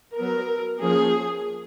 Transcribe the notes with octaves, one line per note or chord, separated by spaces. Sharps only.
F#3 B3 A#4
F3 A#3 C#4 G#4